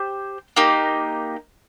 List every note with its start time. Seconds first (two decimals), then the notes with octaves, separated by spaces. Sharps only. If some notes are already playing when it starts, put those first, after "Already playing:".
Already playing: G4 C5
0.56 A#3 D#4 G4